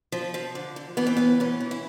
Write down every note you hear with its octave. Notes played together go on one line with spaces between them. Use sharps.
F3
F3
D3
D3
E3 B3
C4
A2 B3
E3 C#4
E3
E4